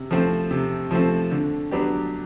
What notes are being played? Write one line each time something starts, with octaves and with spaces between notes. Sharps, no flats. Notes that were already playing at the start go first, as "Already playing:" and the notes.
Already playing: C3
F3 A3 C4
C3
F3 A3 C4
D3
F#3 B3 D4 G4